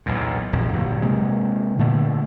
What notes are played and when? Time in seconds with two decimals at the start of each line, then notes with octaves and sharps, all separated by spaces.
0.06 B1 E2 A#2
0.53 D#1 A#1 F2 E3
0.73 G1 A#2 F#3
1.02 C3 G#3 A#3
1.79 A#2 D3 A3